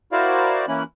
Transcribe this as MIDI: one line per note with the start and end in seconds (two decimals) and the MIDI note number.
0.12 0.65 64
0.12 0.65 66
0.12 0.65 70
0.12 0.65 72
0.12 0.65 74
0.12 0.65 77
0.68 0.83 52
0.68 0.83 58
0.68 0.83 61
0.68 0.83 64
0.68 0.83 90